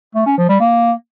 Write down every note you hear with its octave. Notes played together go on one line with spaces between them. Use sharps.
A3
C#4
F3
G3
A#3